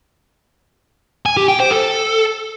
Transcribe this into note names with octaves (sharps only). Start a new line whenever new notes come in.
G#5
G4
G5
C5
A4